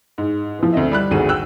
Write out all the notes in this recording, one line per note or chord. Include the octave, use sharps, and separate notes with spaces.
G#2
E3 F3
D2 C4 D#5 E5
G3 B5 F#6
G#1 D2 F#4 G#4 D#7
G5 E6 F#6